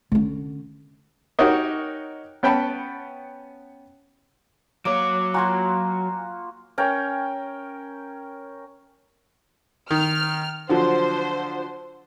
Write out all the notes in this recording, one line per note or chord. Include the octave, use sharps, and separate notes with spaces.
D3 C#4
D#4 F#4 G4 A#4 C#5 D#5
B3 C#4 G5 A5 B5
F#3 A#3 C#5 D6 D7
A#3 F4 F#4 G#5 A#5
C#4 A#4 G5
D#3 F6
D3 F3 F#3 C5